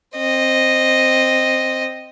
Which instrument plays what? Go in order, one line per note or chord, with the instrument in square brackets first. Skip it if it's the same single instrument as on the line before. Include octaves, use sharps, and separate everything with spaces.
[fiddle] C4 D#5